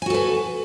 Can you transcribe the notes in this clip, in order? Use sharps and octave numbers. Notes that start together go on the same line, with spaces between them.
F#4 A4 B4 G#5